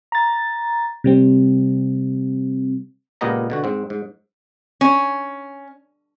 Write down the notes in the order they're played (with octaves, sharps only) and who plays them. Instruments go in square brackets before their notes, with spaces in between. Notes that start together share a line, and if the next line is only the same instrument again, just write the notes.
[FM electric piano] A#5 A6
C3 G3 C4
[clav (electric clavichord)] C#2 A#2 B3 G4 D#5 A#5
B2 D3 F#4
G#2 C4
G#2
[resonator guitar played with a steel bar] C#4